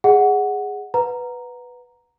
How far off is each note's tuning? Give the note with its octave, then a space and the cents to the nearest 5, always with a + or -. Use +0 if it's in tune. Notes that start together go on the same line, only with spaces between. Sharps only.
G#4 -10 D#5 -5 F#5 +0
B4 +0 F#5 -25 A#5 +0